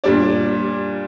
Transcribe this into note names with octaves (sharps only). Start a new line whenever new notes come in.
A#2 G3 D4 D5